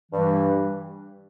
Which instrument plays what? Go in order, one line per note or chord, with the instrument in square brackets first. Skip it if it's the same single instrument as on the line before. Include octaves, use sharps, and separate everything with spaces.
[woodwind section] G2 E3 G3